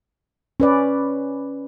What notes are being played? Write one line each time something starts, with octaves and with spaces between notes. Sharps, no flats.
C#4 B4 D5